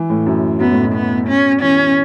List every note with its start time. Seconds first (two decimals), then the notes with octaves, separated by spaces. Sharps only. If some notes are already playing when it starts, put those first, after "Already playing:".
Already playing: E3
0.10 A2
0.26 F#2
0.60 F#2 B3
0.72 A2
0.83 B2
0.95 B3
1.28 C#4
1.62 E3 C#4